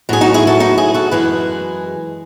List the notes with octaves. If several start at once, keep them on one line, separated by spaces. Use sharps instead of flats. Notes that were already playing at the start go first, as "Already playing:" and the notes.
A2 F#3 G#4
D#4 F#4
E4 G#4
F#4 A4
D#4 F#4
E4 G#4
F#4 A4
F#2 E3 G#3 G#4 B4